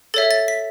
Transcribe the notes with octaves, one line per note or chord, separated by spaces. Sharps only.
A4 C#5 E5 A6
A6
B6